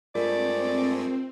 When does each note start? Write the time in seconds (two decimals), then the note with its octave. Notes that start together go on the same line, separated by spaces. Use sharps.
0.15 G2 G#3 A3 C4 F4 A#4 D5